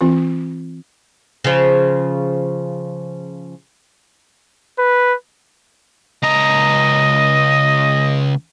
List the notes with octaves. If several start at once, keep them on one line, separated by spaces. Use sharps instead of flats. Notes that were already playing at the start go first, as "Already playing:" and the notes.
E3 C4 F4
C#3 F3
B4
C#2 D#5 A#5